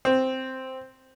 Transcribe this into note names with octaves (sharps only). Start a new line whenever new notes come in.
C4